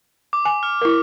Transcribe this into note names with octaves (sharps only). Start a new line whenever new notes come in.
D6
G#5
F6
E4 A#4